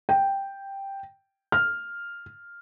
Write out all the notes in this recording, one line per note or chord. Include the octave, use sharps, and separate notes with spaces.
G5
F6